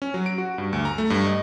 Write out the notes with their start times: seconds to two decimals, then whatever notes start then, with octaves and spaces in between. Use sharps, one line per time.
0.02 C#4
0.14 F#3
0.26 D7
0.38 F#4
0.58 G2
0.73 D2
0.85 A#5
0.98 A3
1.10 G2
1.26 D#5